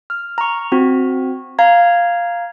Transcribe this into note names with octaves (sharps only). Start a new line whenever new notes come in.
F6
A#5 C#6
C4 F#4
F5 A#5 G#6